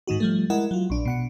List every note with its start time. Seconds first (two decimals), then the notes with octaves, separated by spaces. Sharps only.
0.07 G#2 D#3 D#4 F#4
0.20 F3 G3 A3
0.50 G#3 E4 A#4 D#5 F#5
0.71 F#3 F4
0.90 A#1 D4
1.05 B2 F#5 C#7